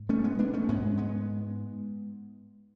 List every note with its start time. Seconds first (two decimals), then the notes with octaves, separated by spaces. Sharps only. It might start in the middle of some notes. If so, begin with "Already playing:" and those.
Already playing: G#2
0.09 A3 C#4
0.24 G#3 B3
0.39 B3 D4
0.54 A3 C#4
0.69 G#2 G#3 B3
0.98 G#3 B3